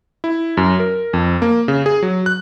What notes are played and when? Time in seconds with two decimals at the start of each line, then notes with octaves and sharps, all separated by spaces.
0.24 E4
0.57 F#2
0.80 A#4
1.13 F2
1.42 A#3
1.68 C#3
1.86 G#4
2.03 F#3
2.26 F#6